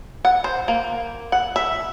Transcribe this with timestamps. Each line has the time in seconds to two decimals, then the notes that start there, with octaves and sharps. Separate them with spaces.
0.25 F#5
0.44 C5
0.68 A#3
1.32 F#5
1.56 E5